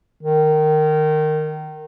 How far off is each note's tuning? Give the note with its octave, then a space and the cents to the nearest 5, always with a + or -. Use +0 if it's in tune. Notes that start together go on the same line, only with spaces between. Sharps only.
D#3 -15